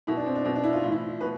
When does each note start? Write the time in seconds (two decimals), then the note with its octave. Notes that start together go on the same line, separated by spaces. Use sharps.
0.07 B2 E4
0.17 D4
0.27 C4
0.35 D4
0.45 B2 C4
0.55 D4
0.64 E4
0.73 F4
0.83 A2 F4
0.86 E3
0.92 E4
1.21 B2 B4